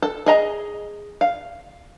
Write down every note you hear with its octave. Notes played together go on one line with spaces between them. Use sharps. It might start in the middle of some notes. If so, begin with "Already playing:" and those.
A4
G#4 D#5 A#5
F5